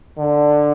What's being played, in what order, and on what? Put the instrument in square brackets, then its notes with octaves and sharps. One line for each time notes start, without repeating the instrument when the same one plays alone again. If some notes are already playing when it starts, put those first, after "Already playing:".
[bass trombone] D3